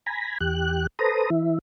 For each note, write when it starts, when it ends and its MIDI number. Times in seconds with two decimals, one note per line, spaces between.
0.06 0.38 80
0.06 0.38 82
0.06 0.38 83
0.41 0.87 40
0.41 0.87 67
0.41 0.87 90
0.99 1.30 69
0.99 1.30 71
0.99 1.30 72
0.99 1.30 82
0.99 1.30 87
1.30 1.58 52
1.30 1.58 64